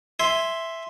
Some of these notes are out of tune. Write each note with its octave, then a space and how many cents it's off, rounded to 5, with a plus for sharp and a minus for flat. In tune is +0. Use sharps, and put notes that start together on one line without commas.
E5 +0 G#5 +0 C6 +0